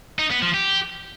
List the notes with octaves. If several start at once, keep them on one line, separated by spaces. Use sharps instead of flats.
D#4
B3
F3
G4